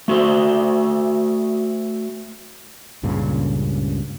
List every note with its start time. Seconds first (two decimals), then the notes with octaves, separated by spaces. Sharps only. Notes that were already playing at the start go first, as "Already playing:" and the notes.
0.08 A3 F#4 A4 C5
3.03 C#2 G2 A#2 C#3